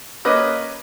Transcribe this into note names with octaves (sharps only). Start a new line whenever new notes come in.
A#3 C#4 B4 D#5 D6